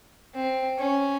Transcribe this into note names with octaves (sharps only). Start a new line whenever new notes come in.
C4
C#4